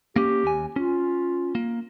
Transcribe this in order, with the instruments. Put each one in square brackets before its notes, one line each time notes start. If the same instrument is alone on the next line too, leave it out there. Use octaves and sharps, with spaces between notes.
[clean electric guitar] A#3 C#4 [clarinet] G4
[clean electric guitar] D#2 G#5
[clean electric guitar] C#4 [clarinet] F4
[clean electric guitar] A#3